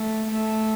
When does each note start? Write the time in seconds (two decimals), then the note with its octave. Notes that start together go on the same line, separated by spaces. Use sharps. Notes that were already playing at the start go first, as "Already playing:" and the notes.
Already playing: A3
0.31 A3